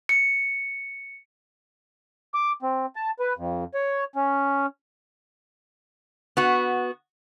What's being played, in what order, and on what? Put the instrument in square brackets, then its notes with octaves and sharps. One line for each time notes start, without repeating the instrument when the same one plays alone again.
[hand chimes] C#7
[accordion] D6
C4
A5
B4
F2
C#5
C#4
[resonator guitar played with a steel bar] B3 F#4